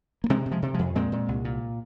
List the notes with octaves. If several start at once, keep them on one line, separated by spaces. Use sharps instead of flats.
A#3
C3 G#3 C4
C3
F3 G#3
C3
F3 G#3
F2
A#2 G#3 C4
A#2
C2
A#2